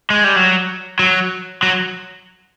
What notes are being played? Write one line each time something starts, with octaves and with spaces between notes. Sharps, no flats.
G#3
G3
F#3
F#3
F#3